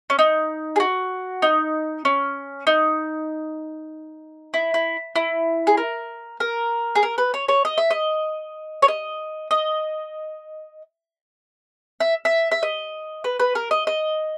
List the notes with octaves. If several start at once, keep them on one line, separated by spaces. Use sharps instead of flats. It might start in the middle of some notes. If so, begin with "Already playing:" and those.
C#4
D#4
G#4
F#4
D#4
C#4
D#4
E4
E4
E4
G#4
A#4
A#4
G#4
A#4
B4
C#5
C#5
D#5
E5
D#5
C#5
D#5
D#5
E5
E5
E5
D#5
B4
B4
A#4
D#5
D#5